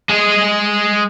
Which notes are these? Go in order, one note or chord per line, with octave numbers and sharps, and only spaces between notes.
G#3 G#4